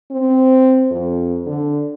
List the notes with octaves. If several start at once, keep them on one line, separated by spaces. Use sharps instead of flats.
C4
F2
D3